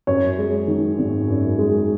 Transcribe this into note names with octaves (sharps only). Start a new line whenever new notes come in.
F#2 C#5
G#3
D#3
G#1
F#2
G#3